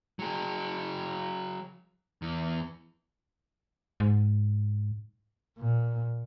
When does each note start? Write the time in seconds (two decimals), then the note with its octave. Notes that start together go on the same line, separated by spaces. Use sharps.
0.19 F#3 G#4
2.22 E2
4.00 G#2
5.58 A#2